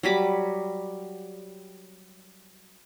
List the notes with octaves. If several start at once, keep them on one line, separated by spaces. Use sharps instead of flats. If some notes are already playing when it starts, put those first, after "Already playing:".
F#3 G3 B5 D6